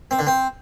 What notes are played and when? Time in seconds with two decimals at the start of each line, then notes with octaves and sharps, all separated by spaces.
0.11 C4
0.19 D3
0.27 C4